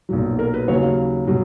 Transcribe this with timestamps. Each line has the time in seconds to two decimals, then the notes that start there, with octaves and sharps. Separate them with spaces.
0.09 B1 A#2 F#3
0.39 A#4
0.54 B4
0.68 D#2 C#3 F#3 C#5
0.83 F5
1.27 B2 F#3